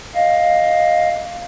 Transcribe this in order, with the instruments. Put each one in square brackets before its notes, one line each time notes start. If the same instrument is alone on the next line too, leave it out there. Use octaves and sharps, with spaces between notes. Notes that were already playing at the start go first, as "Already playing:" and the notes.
[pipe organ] D#5 F5